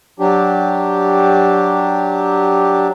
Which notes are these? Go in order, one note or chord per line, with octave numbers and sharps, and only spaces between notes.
F#3 D4 G4